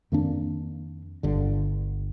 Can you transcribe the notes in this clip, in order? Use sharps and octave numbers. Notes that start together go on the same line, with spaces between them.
F2 D#3 A#3 D4
G1 G2 D3